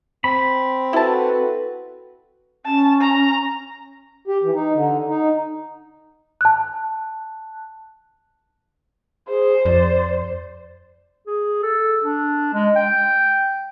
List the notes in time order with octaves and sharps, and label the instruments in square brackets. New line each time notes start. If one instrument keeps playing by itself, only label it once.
[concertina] C4 [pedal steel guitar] B5
[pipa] E4 A5 [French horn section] F#4 A4 B4
[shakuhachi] C#4 [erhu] A5
[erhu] A#5
[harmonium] G4
E3
D#4
D3
D#4
[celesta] A5 F#6
[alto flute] G#4 [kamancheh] C5
[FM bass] F2 [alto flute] D5
[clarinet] G#4
A4
D4
G#3
G5